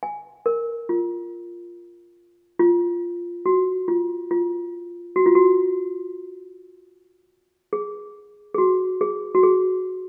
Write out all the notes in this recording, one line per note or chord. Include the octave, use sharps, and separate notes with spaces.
G#5
A#4
F4
F4
F#4
F4
F4
F#4
F4
F#4
G#4
G#4
F#4
G#4
F#4
G#4